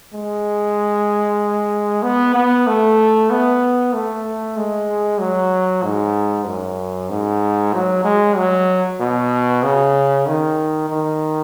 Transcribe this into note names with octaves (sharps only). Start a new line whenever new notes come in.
G#3
B3
B3
A3
B3
A3
G#3
F#3
G#2
F#2
G#2
F#3
G#3
F#3
B2
C#3
D#3
D#3